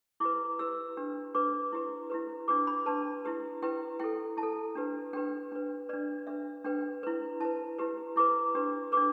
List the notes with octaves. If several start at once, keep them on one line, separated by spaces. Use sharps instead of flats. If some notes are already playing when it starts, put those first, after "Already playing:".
E4 G4 B4 D6
E4 G4 B4 E6
D4 G4 B4
D4 G4 B4 D6
E4 G4 B4
E4 G4 B4
D4 G4 B4 D6
B5
D4 G4 B4 A5
E4 G4 B4
E4 G4 B4 G5
E4 A4 G5
E4 A5
A4
D4 G4 B4
D4 G4 B4 G5
D4 B4
D4 B4 D5
D4 B4 E5
D4 B4 G5
E4 B4
E4 B4 A5
E4 G4 B4
E4 G4 B4 D6
D4 G4 B4
D4 G4 B4 D6